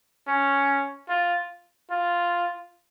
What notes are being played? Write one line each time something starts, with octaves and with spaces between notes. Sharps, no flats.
C#4
F4
F4